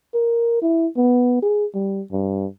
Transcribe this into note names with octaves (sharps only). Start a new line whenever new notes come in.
A#4
E4
B3
G#4
G3
G2